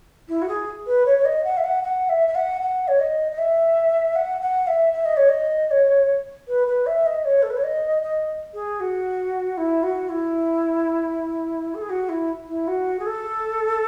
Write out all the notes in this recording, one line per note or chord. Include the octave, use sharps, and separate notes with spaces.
E4
F#4
G#4
B4
C#5
C#5
D#5
F#5
E5
F#5
F#5
E5
E5
F#5
F#5
C#5
D#5
D#5
E5
F#5
F#5
E5
E5
D#5
C#5
D#5
C#5
B4
B4
E5
D#5
C#5
A4
B4
C#5
D#5
D#5
G#4
F#4
E4
F#4
E4
A4
G#4
F#4
E4
E4
F#4
G#4
A4